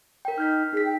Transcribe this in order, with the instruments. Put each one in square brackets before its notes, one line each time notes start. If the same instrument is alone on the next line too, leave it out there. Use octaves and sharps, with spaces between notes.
[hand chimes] A#4 G5
[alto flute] D#4 [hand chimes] F6 G6 B6
[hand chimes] D#4 B6 [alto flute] G#4
[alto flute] G5